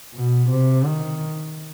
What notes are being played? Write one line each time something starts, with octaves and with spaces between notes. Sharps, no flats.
B2
C3
D#3